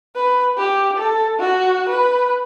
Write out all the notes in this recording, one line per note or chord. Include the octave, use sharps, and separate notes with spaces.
B4
G4
A4
F#4
B4